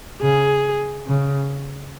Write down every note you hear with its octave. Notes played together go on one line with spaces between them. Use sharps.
C#3 G#4
C#3